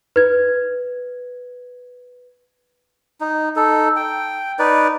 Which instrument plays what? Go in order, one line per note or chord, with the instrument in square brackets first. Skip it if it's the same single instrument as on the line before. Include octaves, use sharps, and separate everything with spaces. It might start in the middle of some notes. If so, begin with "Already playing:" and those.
[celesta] B4 G#6
[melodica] D#4
D#4 A4
G5
D#4 B4 D5